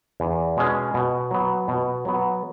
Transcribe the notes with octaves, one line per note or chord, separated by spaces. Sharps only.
E2
B2 G#3 C#4 G#4
B2
F#3 B3
B2
F#3 B3